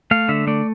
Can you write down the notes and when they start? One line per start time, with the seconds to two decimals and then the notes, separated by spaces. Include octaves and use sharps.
0.11 A3 F5
0.29 D3 E5
0.47 A3 D5